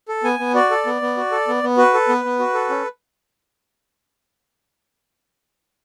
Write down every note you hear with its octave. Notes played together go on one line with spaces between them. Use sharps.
A4
B3 G#5
B3
F#4 D5
A4
B3
B3
F#4
A4
B3
B3
F#4 B4
A4
B3
B3
F#4
A4
C#4